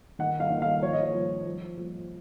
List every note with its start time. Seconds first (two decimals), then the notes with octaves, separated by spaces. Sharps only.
0.19 D#3 F#5
0.40 F5
0.50 D#3
0.62 F5
0.83 F3 C#5
0.93 D#5
1.03 C#5
1.14 F3
1.45 F3
1.77 F3